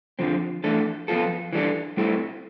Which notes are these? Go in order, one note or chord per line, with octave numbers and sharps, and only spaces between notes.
F2 D3 F3 C4
F2 E3 A3 D4 A4
F3 B3 F4 A4
E3 G3 D4 A4
A2 G3 C4 E4 A4